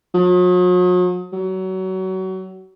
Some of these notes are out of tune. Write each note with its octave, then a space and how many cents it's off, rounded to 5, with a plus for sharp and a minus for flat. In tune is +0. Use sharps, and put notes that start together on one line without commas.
F#3 -45
F#3 +25